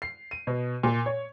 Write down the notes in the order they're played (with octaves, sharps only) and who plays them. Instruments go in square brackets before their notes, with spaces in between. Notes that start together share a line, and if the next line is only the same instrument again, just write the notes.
[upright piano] C7
D#7
B2
A#2
C#5